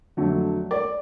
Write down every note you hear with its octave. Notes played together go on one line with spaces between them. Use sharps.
F2 D3 F#3 A3
D5